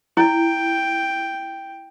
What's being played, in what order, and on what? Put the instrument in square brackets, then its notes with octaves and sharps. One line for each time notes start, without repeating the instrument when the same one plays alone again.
[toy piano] E4 [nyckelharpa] G5